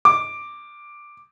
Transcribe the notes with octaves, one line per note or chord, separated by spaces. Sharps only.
D6